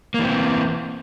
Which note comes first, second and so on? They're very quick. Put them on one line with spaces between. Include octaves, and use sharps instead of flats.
A#3 E3 C4